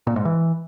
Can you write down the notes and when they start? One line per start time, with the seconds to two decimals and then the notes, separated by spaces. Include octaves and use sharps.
0.07 A#2
0.16 G#2
0.25 E3